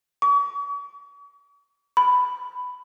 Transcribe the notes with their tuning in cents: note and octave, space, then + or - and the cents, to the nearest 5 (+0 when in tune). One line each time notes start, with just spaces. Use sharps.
C#6 +45
B5 +10